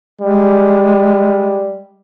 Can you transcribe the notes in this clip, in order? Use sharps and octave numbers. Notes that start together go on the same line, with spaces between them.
G3 G#3